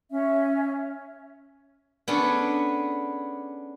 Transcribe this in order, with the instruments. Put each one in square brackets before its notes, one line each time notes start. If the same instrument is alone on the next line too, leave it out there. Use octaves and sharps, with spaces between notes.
[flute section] C#4 E5
[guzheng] B3 C#4 D4 G#4 A4